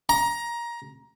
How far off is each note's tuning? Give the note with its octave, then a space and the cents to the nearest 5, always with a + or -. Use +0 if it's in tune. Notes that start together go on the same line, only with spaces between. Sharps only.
A#5 +20